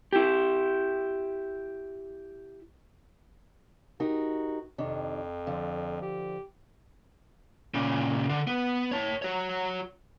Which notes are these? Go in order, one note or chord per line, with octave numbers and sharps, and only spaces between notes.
E4 G4
D#4 F#4 G4 A#4
F2 C3 D#3 D4
D3 F3
G4
A#2 C#3
D3
B3
C#5 A5
F#4 C#5